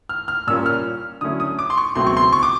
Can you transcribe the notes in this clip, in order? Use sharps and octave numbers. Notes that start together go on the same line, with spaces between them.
F6
F6
A#2 G3 A#3 C#4 F4 E6
F6
D3 F#3 A3 C#4 E4 D#6
D#6
D6
C6
C#6
C#2 B2 F#3 A3 C4 C6
C#6
C6
C#6
D6